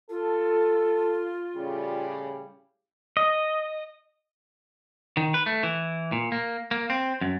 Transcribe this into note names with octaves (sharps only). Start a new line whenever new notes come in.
F4 A4
A2 C#3 G3
D#5
D#3
B4
A3
E3
A#2
A#3
A#3
C4
F#2